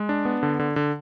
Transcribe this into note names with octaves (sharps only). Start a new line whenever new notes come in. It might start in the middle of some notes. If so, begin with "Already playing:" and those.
Already playing: G#3
D4
B3
D3
D3
D3